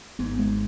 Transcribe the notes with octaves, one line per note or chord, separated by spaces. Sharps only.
G#1 G#2 B3
G#3